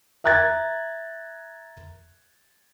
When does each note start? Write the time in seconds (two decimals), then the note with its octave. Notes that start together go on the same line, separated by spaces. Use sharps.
0.24 E5 A#5 F#6 G#6 A6